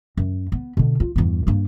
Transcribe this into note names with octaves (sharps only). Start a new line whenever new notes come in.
F#2
B3
B2 D3
F4
E2 G2
G2 A#3